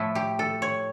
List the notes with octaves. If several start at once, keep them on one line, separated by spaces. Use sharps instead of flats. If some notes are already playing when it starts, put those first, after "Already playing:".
Already playing: A2 F3 A3 E4
G4
A4
C#5